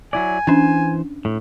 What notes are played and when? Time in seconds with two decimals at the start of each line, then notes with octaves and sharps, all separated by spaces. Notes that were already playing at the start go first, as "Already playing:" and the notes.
0.13 F#3 E4 D5 G#5
0.47 E3 C#4 D4 C5
1.25 A2